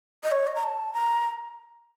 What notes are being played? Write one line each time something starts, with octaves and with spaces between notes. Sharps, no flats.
D#5
C#5
D#5
A#5
A5
A#5